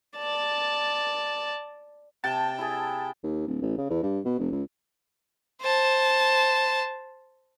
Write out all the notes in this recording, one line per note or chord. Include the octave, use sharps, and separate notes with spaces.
D5 A5
C3 G5 A5
E4 G#4
D#2
D1
A1
C#3
E2
G2
B2
F1
C#2
C5 A5